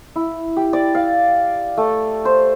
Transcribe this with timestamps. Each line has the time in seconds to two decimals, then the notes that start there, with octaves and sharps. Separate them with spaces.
0.16 E4
0.57 G4
0.73 D5
0.95 F5
1.77 A3
2.25 C5